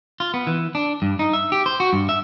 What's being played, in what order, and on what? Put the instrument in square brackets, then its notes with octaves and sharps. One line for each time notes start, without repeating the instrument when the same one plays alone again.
[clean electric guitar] F4
B3
E3
D4
G2
D#4
E5
G4
C5
F#4
G2
E5